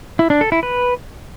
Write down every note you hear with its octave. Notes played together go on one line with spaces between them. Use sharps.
E4
D4
A4
E4
B4